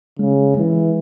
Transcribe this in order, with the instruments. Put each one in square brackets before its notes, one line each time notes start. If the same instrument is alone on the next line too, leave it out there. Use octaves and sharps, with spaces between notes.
[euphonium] C#3 [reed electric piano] G#3
[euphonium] E3 [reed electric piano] G#3